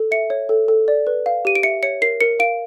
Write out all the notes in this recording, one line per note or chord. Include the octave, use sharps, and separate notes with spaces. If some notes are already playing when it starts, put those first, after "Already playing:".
Already playing: A4
E5 C#7
C#5
A4
A4
D5
B4
F5
G4 D#7
D7
E5 C#7
C#5 C#7
A#4 C7
A#4 C#7
F5 D7